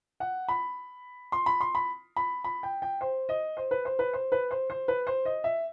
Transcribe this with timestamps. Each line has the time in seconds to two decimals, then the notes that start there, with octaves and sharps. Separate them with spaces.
0.20 F#5
0.48 B5
1.32 C6
1.46 B5
1.60 C6
1.75 B5
2.17 B5
2.44 B5
2.63 G5
2.82 G5
3.01 C5
3.29 D#5
3.57 C5
3.71 B4
3.85 C5
3.99 B4
4.13 C5
4.32 B4
4.51 C5
4.70 C5
4.88 B4
5.07 C5
5.25 D#5
5.44 E5